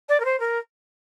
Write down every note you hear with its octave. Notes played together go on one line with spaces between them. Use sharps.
D5
A#4
C5
A#4